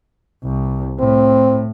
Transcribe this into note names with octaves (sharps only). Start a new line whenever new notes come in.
C2
A2 C4